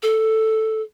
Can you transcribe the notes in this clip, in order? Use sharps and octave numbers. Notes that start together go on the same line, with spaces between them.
A4